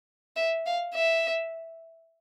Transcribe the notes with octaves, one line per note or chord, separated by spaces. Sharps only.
E5
F5
E5